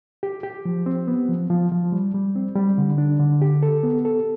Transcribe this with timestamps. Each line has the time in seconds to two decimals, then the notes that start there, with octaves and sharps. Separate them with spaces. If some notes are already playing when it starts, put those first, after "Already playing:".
0.23 G4
0.43 G4
0.65 F3
0.86 C4
1.08 B3
1.29 F3
1.50 F3
1.72 F3
1.92 G3
2.14 G3
2.35 C4
2.56 G3
2.78 D3
2.98 D4
3.20 D3
3.42 G4
3.63 A4
3.83 B3
4.05 A4